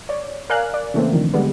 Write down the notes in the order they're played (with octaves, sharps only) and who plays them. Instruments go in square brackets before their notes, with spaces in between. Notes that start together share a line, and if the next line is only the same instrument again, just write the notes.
[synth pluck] C#5 D5
A#4 D5 F5 G#5 F#6
D5
C#3 E3 A3 A#3 C4
D3 D#3 F3
D3 G3 G#3 B3